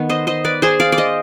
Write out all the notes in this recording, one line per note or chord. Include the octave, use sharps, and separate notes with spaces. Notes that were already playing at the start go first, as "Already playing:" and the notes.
Already playing: D#3 B3
C5 D#5
C5 D#5
B4 D5
G#4 C5
D5 F5
D5
C5 D#5